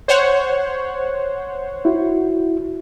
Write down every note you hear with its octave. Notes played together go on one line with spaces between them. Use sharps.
C5 C#5 F#5
E4 F#4